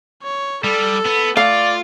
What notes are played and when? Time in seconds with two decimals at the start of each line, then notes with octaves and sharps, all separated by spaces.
0.23 C#5
0.64 G3 A4
1.05 B3
1.37 A3 F4 D5 F5